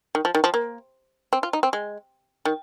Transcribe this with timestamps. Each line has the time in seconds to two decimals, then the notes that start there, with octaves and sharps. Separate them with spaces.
0.15 D#3
0.25 F3
0.35 D#3
0.44 F3
0.54 A#3
1.33 C4
1.43 F4
1.53 D#4
1.63 C4
1.73 G#3
2.45 D#3